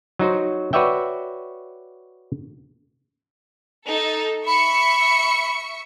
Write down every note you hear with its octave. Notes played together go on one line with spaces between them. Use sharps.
F#3 D#4 F#4 C5
F#4 B4 C#5 D5 E5 G5
D#4 A4
E5 B5 C#6 C#7